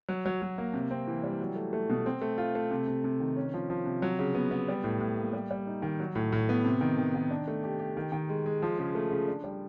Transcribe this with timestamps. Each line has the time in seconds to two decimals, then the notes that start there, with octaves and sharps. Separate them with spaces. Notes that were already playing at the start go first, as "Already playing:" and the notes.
0.09 F#3
0.26 F#3
0.42 F#3
0.58 A#3
0.74 C3
0.91 C4
1.07 E3
1.23 G3
1.40 F#3
1.56 A3
1.73 A3
1.90 B2
2.06 C4
2.22 A3
2.38 F4
2.55 A3
2.71 C3
2.87 C3
3.04 C3
3.20 D#3
3.37 C#4
3.54 F3
3.70 F3
3.85 C3
4.02 F#3
4.19 C#3
4.35 B3
4.51 B3
4.68 G3
4.84 A2
5.01 A2
5.17 A#3
5.33 G3
5.51 G3
5.67 D#4
5.82 D#3
6.00 F#3
6.15 A2
6.32 A2
6.49 B3
6.65 C3
6.81 D#3
6.98 D#3
7.15 D#3
7.31 D4
7.48 A3
7.64 G4
7.79 G4
7.97 D#3
8.12 D#3
8.29 G#3
8.46 G#3
8.62 F3
8.79 C#3
8.95 A3
9.11 C#3
9.28 D4
9.44 G3